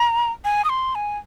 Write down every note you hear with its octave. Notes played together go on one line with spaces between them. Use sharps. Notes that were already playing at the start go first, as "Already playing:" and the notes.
Already playing: A#5
G#5
D#6
C6
G#5